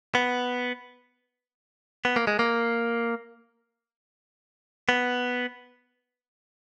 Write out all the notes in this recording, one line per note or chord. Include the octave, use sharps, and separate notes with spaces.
B3
B3
A#3
G#3
A#3
B3